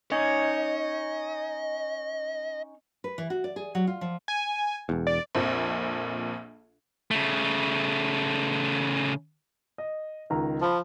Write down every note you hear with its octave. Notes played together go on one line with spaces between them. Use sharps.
C#4 D#4 C#5 D#5
B4
E3
F#4
D5
G#4
F#3
F4
F3
G#5
E1 E2
D5
A#1 F2 A#2
C#3 A3
D#5
C#2 D#3 A#5
F3 A5 B5